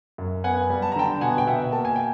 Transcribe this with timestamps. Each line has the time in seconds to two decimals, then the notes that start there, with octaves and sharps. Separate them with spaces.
0.18 F#2
0.44 B3 F#5 G#5
0.70 G3
0.82 A5
0.92 A#5
0.96 D3 G5 A5
1.21 B2 F#5 G#5
1.38 G5
1.47 B2 E5 F#5
1.72 A#3 A5
1.85 G#5
1.96 G5